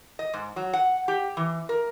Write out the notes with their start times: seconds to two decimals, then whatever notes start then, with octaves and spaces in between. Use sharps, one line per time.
0.19 D#5
0.34 G#2
0.56 F#3
0.73 F#5
1.08 G4
1.37 E3
1.69 A#4